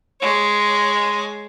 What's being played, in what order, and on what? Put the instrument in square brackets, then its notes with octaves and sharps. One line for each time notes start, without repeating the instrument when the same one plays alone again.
[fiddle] G#3 C#5